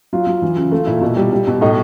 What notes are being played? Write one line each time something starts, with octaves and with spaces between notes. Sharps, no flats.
F#3 F4
F#3
E3
C#3
A3 F4
A#2 E4
B2
G3
G3
B2
A2 D#4